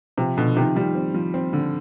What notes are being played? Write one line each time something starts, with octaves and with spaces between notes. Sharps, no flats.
C3 F3
B2 D3 F3
C3 D#3 F3
D#3 F3 G3
C4
F3
C4
D3